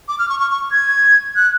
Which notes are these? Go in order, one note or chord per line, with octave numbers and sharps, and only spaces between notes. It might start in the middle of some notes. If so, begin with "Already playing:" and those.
D6
F6
C#6
C#6
C#6
G#6
F#6